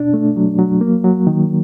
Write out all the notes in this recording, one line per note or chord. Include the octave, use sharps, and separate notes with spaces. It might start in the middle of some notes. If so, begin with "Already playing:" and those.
Already playing: B2 D4
A3
F#3
F#3
A#3
F#3
D#3